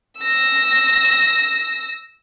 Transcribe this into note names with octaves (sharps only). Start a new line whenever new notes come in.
E6 A#6